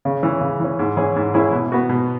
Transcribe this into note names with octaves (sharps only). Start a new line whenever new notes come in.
C#3
E3 C#4
C#3
E3 C#4
G#2
E3 C#4 E4 G#4
G#2
E3 C#4 E4 G#4
B2
B3 F#4
B2